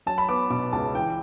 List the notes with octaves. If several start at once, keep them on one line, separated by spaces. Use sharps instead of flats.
F#3 A5
B5
B3 D6
B2 D6
C#2 A5
E3 G5